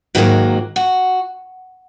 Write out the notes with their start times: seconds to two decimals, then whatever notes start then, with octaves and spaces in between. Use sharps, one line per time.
0.15 G#2 D#3 F#3 A#3 F#4
0.76 F#4